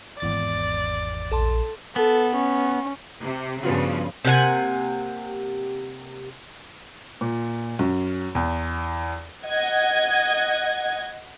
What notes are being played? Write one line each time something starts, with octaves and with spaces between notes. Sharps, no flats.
G#1 E2 D5 A6
A#1 A4 A5 C6
B3 A4
C#4
C3
G2 C#3 F3 B3 F4 F#4
C3 A#3 F#5 G#5
A#2
F#2
E2
D#5 F#5 G#6